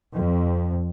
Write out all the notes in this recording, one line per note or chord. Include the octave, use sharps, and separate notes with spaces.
F2